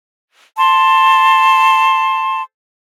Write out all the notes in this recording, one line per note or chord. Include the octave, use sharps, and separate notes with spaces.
A5 C6